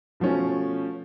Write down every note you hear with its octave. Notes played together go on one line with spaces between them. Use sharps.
B2 F3 A3 C#4